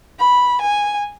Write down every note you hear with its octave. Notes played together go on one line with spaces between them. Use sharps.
B5
G#5